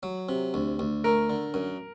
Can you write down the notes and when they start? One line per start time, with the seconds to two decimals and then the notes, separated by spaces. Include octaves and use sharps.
0.03 F#3
0.29 C3
0.54 D2
0.79 D2
1.04 A3 A#4
1.30 D3
1.54 F#2